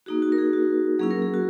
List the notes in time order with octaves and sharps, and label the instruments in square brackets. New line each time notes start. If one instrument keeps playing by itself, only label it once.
[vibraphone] A#3 D#4 F#4 G#4
F#4
A#4
G#4
F#4
F#3 A#3 C#4 E4 G#4
A#4
G#4
F#4